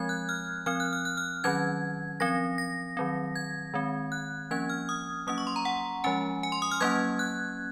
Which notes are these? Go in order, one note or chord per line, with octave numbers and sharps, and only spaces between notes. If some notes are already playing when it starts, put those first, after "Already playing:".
Already playing: F3 G#3 C4 G#6
F#6
F6
F3 C4 F6
F#6
F6
F#6
F6
D#3 F#3 C#4 G#6
F3 C4 A#6
A#6
D#3 F#3 C4
G#6
D#3 G#3 C4
F#6
F3 A#3 C#4 G#6
F6
D#6
F#3 A#3 C#4 D#6
C#6
C6
A#5
F#5
F3 G#3 C#4 G#5
G#5
C6
D#6
F6
F#3 A#3 C#4 G#6
F#6